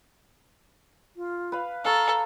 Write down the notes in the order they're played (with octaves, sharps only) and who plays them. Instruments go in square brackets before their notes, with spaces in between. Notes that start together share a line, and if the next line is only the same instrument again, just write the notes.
[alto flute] F4
[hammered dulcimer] B4 F5
[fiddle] A4 [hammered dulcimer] F5 C#6 [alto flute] A#5